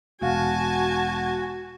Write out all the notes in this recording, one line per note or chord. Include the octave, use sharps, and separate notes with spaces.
E1 F#4 F5 G#5 A5